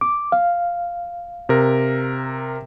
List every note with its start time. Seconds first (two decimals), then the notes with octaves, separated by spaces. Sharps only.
0.01 D6
0.32 F5
1.49 C3 A#4